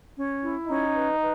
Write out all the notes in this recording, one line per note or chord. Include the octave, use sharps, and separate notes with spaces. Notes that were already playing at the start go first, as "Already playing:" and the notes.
C#4
E4
C#4 D#4
B4
B4